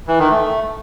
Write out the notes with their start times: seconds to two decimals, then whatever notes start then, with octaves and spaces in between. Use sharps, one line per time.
0.08 E3
0.19 D#3
0.31 A3